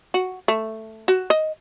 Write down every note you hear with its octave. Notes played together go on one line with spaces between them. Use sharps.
F#4
A3
F#4
D#5